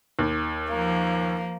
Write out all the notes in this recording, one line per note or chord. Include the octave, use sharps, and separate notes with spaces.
D#2
F3 A#3